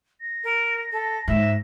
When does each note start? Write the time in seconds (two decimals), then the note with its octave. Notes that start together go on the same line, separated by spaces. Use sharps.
0.21 A#6
0.44 A#4
0.92 A4
1.28 G#2 E5